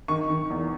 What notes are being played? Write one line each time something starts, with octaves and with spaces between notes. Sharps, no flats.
D#3 C#6
D#3
E2